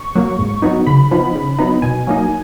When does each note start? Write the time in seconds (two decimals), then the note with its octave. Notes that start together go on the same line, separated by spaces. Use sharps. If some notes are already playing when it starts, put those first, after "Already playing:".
Already playing: C#6
0.15 F#3 A#3
0.39 G#2
0.62 F#3 B3 D#4
0.87 C#3 B5
1.11 F3 B3 D#4
1.35 C#3
1.59 F#3 B3 D#4
1.82 B2 G#5
2.07 F#3 A#3 D#4